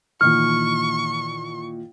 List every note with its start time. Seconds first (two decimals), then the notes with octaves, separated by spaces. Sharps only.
0.21 A#2 D#3 E3 C#6 F6